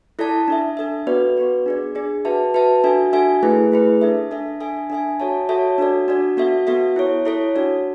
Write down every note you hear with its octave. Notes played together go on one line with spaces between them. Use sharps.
E4 A4 D5 A5
D4 A4 E5
D4 A4 E5
B3 F#4 B4 D5
B3 F#4 B4 D5
D4 G#4 D5
D4 G#4 D5
F#4 B4 E5 A5
F#4 B4 E5 A5
D4 F#4 A4 E5 G#5
D4 F#4 A4 E5 G#5
A3 E4 G#4 B4
A3 E4 G#4 B4
D4 A4 E5
D4 A4 E5
D4 A4 E5 G#5
D4 A4 E5 G#5
F#4 A4 C#5 E5 A5
F#4 A4 C#5 E5 A5
D4 F#4 A4 D5
D4 F#4 A4 D5
B3 F#4 A4 E5
B3 F#4 A4 E5
E4 A4 C#5
E4 A4 C#5
D4 F#4 A4 D5